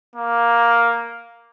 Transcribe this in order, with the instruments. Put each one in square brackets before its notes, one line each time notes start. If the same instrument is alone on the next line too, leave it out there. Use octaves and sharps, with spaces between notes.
[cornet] A#3